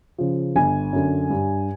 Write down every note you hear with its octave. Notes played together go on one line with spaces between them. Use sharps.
C#3 F3
G1 G#5
F#2 D3
G2